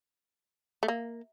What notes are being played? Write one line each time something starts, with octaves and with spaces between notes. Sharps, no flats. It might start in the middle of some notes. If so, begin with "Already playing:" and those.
A3
A#3